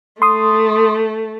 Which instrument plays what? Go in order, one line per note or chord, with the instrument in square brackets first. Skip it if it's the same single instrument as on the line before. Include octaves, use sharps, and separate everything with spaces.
[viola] A3 [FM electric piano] C6 D#6